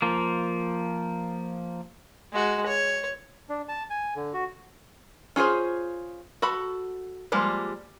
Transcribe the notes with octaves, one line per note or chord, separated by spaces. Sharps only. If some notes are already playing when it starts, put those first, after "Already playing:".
F3 A#3
G#3 F#4
C#5
D4
A5
G#5
D3
F#4
C#4 F4 G#4 C5
F#4 A4 B5
F3 G3 G#3 A#3